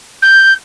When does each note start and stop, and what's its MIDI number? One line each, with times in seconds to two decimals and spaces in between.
0.22 0.53 91